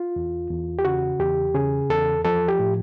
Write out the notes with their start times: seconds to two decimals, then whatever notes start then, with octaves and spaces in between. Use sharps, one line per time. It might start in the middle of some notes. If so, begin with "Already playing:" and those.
Already playing: F4
0.16 E2
0.50 E2
0.79 G4
0.85 C#3 F#4
1.20 E2 G4
1.54 C#3 G#4
1.90 E2 A4
2.25 F3 A4
2.48 G4
2.59 A2